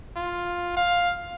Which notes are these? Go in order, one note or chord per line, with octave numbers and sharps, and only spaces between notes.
F4
F5